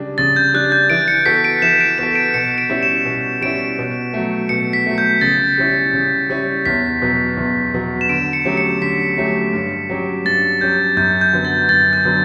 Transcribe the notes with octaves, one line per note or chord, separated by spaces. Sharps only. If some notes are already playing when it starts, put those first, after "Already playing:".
Already playing: C#3 G3 D4
C#3 A6
G6
G3 D4 F#6
G6
E3 D7
C#7
B3 F#4 A4 B6
D7
E3 E7
D7
B3 F#4 A4 E7
D7
B2 C#7
D7
G3 C#4 E4
E7
B2
G3 C#4 E4 D7
B2
F#3 A3
B2 C#7
B6
F#3 A3
G6
C#3 A6
G3 C#4 E4
C#3
G3 C#4 E4
E2 B6
B2 F#3 B3
E2
B2 F#3 B3
E7
D3 D7
C#7
F#3 A3 C#4 G4
C#7
D3 B6
F#3 A3 C#4 G4
G2
F#3 C#4 G4
G2 A6
F#3 C#4 G4 G6
F#2 G6
G6
D3 F#3 B3
A6
F#2 A6
G6
D3 F#3 B3